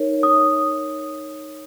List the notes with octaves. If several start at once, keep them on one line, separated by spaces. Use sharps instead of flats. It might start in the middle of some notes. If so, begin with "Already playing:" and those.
Already playing: D#4 A#4 C#5
D#6